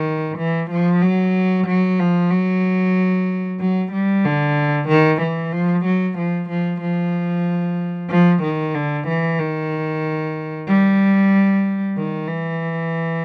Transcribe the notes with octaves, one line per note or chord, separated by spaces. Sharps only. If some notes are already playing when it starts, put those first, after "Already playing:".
Already playing: D#3
E3
F3
F#3
F#3
F3
F#3
F#3
G3
D3
D#3
E3
F3
F#3
F3
F3
F3
F3
D#3
D3
E3
D#3
G3
D#3
E3